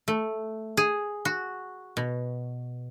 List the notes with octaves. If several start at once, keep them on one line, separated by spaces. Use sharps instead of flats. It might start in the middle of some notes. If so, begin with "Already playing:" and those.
A3
G#4
F#4
B2